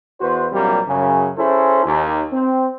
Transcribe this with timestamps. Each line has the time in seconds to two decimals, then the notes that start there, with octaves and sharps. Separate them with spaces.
0.21 E2 F#4 B4 C5
0.52 A#1 C3 F#3 G3 A#3
0.88 F#2 C#3
1.38 C#4 E4 G#4 A4 C5
1.85 D#2
2.33 C4